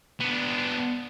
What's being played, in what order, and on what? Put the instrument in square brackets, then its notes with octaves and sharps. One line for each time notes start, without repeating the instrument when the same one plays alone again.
[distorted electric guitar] B3 D4